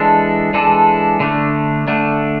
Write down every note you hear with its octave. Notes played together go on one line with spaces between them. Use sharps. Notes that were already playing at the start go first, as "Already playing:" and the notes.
Already playing: E3 G#3 D4 A4
E3 G#3 D4 A4
D3 A3 D4
D3 A3 D4